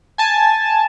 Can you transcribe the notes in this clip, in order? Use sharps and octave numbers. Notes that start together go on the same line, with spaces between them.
G#5 A5